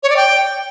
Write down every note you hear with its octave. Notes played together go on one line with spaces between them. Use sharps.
C#5
D5
G5